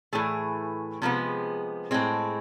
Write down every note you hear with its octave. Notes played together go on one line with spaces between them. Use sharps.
A2 E3 A3 G#4
C3 F3 G#3 B3
A2 G#3 C4